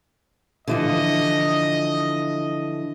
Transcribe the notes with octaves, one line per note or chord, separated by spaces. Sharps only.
D3 E3 F3 D#5